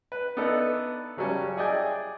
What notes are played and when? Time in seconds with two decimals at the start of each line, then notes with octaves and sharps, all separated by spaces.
0.12 B4
0.37 B3 D4 D#4 A4 B4 E5
1.17 C#3 F#3 G3 C#4 A5
1.56 E4 G#4 D5 D#5 G5 G#5